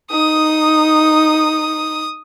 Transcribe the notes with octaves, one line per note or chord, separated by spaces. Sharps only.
D#4 D#6